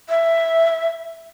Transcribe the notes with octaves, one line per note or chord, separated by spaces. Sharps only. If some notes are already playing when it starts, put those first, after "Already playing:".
E5